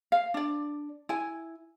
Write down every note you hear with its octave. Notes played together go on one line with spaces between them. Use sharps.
F5
D4 D5
E4 G#5